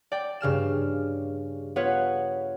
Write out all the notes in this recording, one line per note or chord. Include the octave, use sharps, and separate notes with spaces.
D5 G5
G2 C#3 F6 E7
B3 F4 B4 C#5